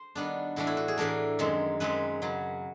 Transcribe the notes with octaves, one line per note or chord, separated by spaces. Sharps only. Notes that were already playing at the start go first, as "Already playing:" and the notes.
Already playing: C5
D#3 G3 B3 D4
A2 E3 A3 D4 F#4
E4
F#4
G#4
A2 E3 A3 D4 A#4
F#2 D#3 G#3 C4
F#2 D#3 G#3 C4 B4
F#2 C#3 F#3